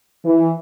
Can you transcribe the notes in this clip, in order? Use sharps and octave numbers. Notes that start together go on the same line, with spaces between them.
E3